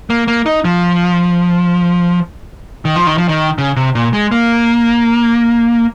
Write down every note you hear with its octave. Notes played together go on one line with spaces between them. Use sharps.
A#3
A#3
D#4
F3
D#3
F3
D#3
F3
D#3
C#3
C3
A#2
G#3
A#3